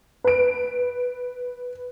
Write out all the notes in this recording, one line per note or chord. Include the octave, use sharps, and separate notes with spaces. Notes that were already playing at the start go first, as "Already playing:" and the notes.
B4 D7